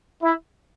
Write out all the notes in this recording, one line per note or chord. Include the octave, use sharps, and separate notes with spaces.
E4